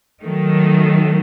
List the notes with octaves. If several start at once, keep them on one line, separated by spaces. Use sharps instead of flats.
D#3 F#3 A3